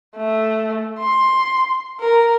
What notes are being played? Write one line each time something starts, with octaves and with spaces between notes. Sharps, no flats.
A3
C6
A#4